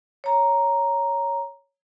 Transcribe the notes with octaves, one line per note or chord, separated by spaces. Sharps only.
C#5 A#5